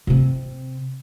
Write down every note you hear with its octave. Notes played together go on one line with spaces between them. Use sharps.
C3 C4